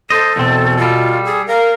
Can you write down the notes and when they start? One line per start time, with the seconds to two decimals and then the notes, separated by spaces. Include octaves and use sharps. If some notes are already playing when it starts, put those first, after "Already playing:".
0.10 A4 C5 D#5
0.36 E2 B2 C4
0.77 G3 F4 A4
1.25 G#4
1.48 A#4 F5